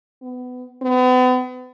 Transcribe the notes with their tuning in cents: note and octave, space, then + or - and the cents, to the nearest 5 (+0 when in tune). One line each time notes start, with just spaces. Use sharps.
B3 +25
B3 +40